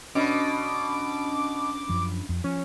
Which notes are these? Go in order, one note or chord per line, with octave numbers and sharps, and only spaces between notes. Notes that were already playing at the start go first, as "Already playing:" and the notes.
B2 C#4 D4 B5 D6
F#2 F3
F2
F3 C#4